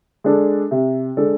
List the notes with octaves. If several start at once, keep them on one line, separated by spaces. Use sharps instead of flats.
G#3 D4 A4
C3
G#3 D4 A4